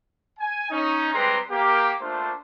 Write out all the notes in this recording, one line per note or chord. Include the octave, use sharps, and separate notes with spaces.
G#5
C#4 D#4
G3 G#3 C4 B4 A#5 C6
A#3 G4
A3 A#3 D4 F4 C5